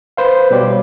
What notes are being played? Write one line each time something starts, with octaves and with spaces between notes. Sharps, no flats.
B4 C5 F5
B2 G3 G4 C#5